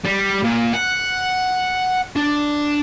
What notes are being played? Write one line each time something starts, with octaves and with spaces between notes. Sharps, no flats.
G3
A#2
F#5
D4